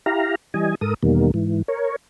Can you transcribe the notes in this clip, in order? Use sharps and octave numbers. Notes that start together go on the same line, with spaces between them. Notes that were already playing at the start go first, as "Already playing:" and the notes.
E4 G4 F5 A#5
E3 G3 D#5 G#5
G#2 A4 A#4 D#6
E2 B2 D#3 G3 A#3
G#2 E3
A#4 C#5